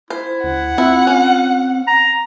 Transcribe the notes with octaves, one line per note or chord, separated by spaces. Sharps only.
E4 C5
D2 F#5
C4 E4 F4
C#4
A#5